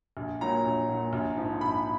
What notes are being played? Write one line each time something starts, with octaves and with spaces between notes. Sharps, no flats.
A#1
A#2 F#3 A#5
A#1
A#2 F#3
A#1
G#2 F3
A#1 B5